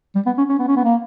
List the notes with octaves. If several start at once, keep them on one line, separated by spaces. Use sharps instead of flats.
G3
B3
C#4
C#4
B3
C#4
B3
A#3